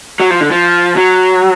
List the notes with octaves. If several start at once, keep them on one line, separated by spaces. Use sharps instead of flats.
F#3
F3
D3
F3
F#3